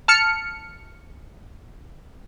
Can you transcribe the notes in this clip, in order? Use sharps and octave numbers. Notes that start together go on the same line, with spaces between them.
A5 F6 C#7